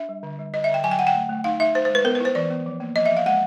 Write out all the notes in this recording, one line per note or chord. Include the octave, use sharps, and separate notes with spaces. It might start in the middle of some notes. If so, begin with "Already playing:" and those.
Already playing: D4 E5
G3
D3
G3
D3 D#5
E5
D3
G5
F#3 G#5
G5
D3 F#5
G5
A3
A3
D#4 F5
D#4 E5
D#4 C5
C5
G#3 B4
B3 A#4
B4
E4 C5
E3 D5
B3
F3
A#3
F3 D#5
E5
F3
F5
G#3 F#5